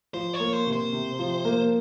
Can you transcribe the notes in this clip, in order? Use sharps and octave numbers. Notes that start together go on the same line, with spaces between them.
F3 C5
C#5
A#3
C5
C3
C5
C3
F3
A#3